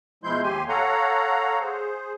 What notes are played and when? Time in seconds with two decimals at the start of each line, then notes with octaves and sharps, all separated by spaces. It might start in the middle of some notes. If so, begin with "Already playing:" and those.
0.24 B2 F3 G#3 E4 C6 G6
0.43 D#2 G4 G#5 C6
0.68 A4 C#5 F5 F#5 A#5
1.60 G#4 C5